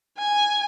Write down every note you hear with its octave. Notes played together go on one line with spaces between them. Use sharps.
G#5